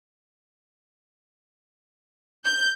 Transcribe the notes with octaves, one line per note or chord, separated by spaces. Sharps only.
G6